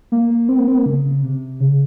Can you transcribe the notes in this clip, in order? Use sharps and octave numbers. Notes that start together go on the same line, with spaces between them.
A#3
A#3
C4
A#3
C4
A#3
C#3
C#3
C3
C#3